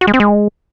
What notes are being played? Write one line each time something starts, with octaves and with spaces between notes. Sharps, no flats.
F#4
G#3
C4
G#3